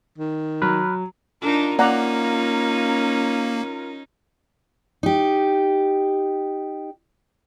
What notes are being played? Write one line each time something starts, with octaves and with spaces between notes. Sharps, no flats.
D#3
F#3 B5 F6 F#6
D4 D#4 F4 A#4
A#3 C#4 D#4 D5 F#5 A#5
D#4 G4